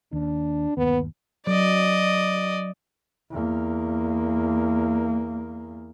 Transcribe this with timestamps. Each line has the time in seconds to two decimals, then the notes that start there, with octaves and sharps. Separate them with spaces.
0.13 D#2 D4
0.77 G1 D#2 B3
1.47 F#3 D5 D#5
3.31 E2 A#3